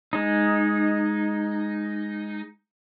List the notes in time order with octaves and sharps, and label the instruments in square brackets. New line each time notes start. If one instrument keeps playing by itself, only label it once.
[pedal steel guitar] G#3 D#4